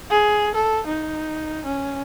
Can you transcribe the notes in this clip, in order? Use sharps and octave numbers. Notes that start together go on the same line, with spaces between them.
G#4
A4
D#4
C#4